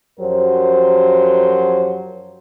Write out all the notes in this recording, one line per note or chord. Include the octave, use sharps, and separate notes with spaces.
F#2 F3 F#3 G4 A#4 C5